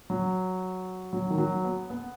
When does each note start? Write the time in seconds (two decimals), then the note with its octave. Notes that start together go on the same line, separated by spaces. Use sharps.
0.10 F#3
1.13 F#3
1.30 D#3
1.38 F#3
1.64 B3
1.90 B3